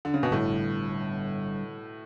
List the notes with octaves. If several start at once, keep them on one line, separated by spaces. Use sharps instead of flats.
D3
C#3
B2
A2 D3 G3 D4